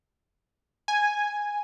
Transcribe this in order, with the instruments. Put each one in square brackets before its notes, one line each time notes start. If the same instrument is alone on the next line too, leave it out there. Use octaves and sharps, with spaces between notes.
[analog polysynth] G#5